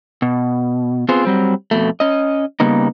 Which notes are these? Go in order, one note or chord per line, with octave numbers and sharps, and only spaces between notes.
B2
B3 C4 F4 G#4 C5
F#3 G3 C4
F2 B2 A3
C#4 D#5
C#3 G3 A#3 B3 D#4